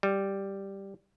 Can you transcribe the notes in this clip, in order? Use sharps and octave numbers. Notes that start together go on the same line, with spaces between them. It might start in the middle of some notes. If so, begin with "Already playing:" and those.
G3